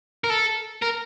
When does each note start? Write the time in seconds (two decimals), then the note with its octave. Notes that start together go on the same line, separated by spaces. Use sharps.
0.24 A#4
0.30 A4
0.82 A#4